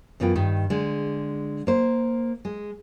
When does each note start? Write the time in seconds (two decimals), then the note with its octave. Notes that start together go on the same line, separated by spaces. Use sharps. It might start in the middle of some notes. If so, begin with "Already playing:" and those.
0.20 F#2 E3 B3 F4 G5
0.35 G2 D#3 D#4
0.70 D3 G#3
1.67 A#3 C5
2.45 G#3